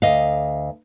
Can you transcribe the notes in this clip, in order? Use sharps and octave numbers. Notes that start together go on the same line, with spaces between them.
D2 D#5 F5